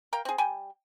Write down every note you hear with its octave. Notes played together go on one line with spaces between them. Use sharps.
A#4 F5 G5
C4 G#4
G3 G5 G#5